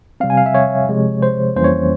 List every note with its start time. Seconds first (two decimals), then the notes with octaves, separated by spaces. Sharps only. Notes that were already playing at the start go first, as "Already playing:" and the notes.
0.20 C3 G3 C4 F5
0.30 G#5
0.37 F5
0.46 E5
0.55 C#5
0.88 C3 F3 G#3
1.22 C5
1.56 F2 E3 G3 A#3 C#4 C5
1.64 C#5